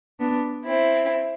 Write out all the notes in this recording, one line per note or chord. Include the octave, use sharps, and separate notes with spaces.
B3 D4
C4 E4